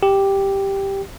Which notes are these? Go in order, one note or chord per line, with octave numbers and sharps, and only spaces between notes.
G4